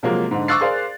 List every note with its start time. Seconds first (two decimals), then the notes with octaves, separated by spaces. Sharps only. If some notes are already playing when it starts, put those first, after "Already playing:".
0.03 C3 F3 F#3 G#3 A#3
0.31 G#2 D3
0.48 C#6 D6 E6 F#6 A6 C7
0.61 G#4 A#4 C5 D5 F5